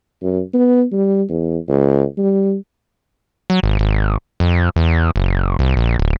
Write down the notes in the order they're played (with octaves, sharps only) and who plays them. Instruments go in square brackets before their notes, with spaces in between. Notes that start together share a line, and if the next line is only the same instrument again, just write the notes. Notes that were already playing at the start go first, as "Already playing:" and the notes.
[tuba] F#2
B3
G3
E2
C#2
G3
[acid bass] F#3
G#1
G#1
F2
E2
F#1
C2
A#1
D1